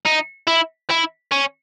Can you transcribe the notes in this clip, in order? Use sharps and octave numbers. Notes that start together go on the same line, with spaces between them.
D#4
E4
E4
C#4